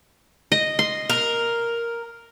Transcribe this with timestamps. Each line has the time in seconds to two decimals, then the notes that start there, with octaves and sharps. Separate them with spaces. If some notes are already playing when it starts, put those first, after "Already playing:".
0.52 D#5
0.79 C6
1.10 A#4